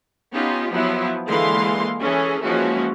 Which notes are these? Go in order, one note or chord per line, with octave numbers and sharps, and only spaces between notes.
B3 C#4 D#4 F4 G4
F3 F#3 B3 E4
D3 E3 G#3 A#3 F5 C6
E3 C#4 G#4 A4
E3 F3 G#3 A#3 C#4 F#4